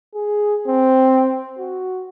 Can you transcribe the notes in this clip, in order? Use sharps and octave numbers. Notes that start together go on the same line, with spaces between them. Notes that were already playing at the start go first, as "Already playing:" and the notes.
G#4
C4
F#4